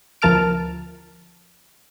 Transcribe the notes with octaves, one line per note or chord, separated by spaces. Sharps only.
D2 F3 A#4 A5 F6 D7